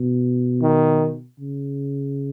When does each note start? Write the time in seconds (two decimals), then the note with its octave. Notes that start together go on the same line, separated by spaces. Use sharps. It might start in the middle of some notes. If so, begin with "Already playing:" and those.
Already playing: B2
0.62 D#3
1.39 C#3